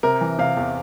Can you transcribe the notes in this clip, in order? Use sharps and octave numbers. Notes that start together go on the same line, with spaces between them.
C3 A#4
E3
C3 F5
E2